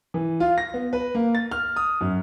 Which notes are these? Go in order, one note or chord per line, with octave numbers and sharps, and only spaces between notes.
E3
F4
A#6
B3
B4
A#3
A6
F6
D#6
F#2